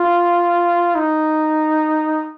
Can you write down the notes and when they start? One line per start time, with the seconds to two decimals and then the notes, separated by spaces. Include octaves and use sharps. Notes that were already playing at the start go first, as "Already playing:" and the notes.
Already playing: F4
0.96 D#4